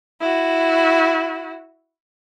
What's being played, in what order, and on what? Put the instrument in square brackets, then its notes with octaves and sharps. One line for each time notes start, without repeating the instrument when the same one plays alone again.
[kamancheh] E4 F#4